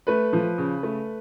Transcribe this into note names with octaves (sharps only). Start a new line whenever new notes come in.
A3 B4
F3
C#3
A3